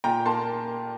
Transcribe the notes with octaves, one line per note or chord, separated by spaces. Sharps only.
A#2 G5 A#5
A#3 A5 C6